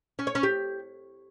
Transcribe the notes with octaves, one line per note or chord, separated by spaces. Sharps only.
C#4
C#5
C#4
G4